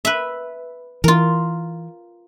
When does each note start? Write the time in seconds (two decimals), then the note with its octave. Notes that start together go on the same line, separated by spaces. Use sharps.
0.05 B4 E5
1.04 E3 F4 A#4